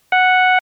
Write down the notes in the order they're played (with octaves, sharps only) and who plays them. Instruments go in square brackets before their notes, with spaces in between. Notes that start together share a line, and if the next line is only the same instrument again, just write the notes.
[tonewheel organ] F#5